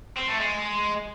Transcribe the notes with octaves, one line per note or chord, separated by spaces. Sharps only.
C4
A3
G#3